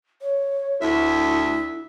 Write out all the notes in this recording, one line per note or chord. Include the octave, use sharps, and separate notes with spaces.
C#5
D2 E4 E5